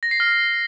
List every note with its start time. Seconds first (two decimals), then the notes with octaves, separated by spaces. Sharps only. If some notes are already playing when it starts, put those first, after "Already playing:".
0.03 A#6
0.11 C7
0.20 F6